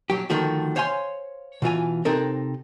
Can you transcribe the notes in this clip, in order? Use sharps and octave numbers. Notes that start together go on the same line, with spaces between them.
B1 F#3 G4
D2 D#3 F3 A3 F#4
C5 C#5 F5 G#5 C6
B2 E3 F4 G#5
C3 C4 D#4 A4 A#4